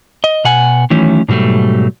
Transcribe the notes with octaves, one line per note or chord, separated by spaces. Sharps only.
D#5
B2 F#5 G#5
D#3 E3 F#3 A3 C#4
G#2 B2 F#3 G3 A3